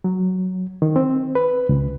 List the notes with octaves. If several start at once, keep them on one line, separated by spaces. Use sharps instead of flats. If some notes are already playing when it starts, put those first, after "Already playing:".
F#3
D#3
C4
B4
C#2